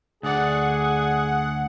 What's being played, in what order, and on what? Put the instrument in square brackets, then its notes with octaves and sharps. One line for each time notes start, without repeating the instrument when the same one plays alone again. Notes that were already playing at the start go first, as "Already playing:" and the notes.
[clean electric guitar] D2 D5 [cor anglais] G#4 [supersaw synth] F#5